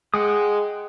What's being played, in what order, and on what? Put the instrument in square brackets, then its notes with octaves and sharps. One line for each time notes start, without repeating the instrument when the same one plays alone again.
[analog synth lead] G#3 [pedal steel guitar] F#5 G5 D#6